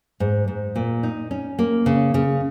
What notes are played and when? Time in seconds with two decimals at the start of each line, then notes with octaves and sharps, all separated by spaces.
0.20 G#2
0.48 G#2
0.76 A#2
1.03 D#4
1.31 C#4
1.59 A#3
1.86 C#3
2.14 C#3